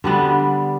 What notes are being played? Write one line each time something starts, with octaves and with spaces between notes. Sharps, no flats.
D3 G3 B3 D4